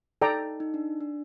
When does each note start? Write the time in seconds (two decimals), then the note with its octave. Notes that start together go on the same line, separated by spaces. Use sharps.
0.22 D#4 A4 D5 G5 A#5
0.60 D#4
0.74 D4
1.01 D4